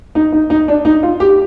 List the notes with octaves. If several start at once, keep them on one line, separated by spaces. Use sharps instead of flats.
D#4
D#4
D#4
D4
D#4
F4
G4